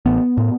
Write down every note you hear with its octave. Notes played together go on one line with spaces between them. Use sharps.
A1 B3
A2